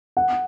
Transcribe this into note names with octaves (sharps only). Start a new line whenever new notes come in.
F#5